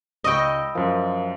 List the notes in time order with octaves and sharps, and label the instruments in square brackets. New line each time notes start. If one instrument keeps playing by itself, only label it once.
[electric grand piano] C#2 C#6 [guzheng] D#5 G5 [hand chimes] B5 E6 A#6
[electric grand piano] F#2 F3 [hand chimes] A#4 C5 F5